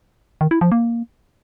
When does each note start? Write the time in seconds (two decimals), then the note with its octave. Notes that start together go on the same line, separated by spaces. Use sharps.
0.41 D#3
0.51 E4
0.61 F3
0.72 A#3